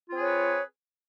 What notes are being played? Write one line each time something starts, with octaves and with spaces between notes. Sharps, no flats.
C4 F4 G#4 B4 C#5